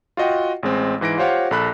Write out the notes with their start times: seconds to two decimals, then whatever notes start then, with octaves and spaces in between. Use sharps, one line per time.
0.17 F4 F#4 D#5 F#5 G5
0.63 A1 G#3 C4
1.01 G#2 E3 A#6 D7
1.18 F4 G4 C5 C#5 F5 F#5
1.51 A#1 A4 B5 F#6